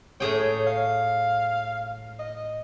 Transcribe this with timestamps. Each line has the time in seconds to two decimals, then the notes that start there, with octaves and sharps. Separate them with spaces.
0.20 A2 G#4 C#5 G5
0.67 F5
2.19 D#5